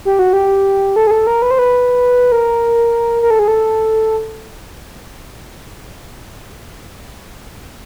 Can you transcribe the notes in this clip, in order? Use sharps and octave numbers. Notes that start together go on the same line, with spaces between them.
G4
F#4
G4
A4
G#4
A4
A#4
B4
C5
B4
A#4
A#4
A4
G#4
A4